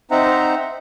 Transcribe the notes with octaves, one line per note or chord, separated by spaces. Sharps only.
C4 D#4 C5 E5 F#5 A#5